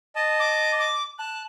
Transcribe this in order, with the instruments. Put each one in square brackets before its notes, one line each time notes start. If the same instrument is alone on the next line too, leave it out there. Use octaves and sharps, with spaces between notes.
[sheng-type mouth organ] D#5 A5
[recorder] D6
D6
[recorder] A5 [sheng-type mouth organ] F#6